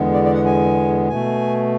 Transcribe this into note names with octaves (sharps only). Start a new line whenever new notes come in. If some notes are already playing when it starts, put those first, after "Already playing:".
Already playing: E2 D3 G#3 B3
D5
D5
F#5
G#5
B2 A3 G#5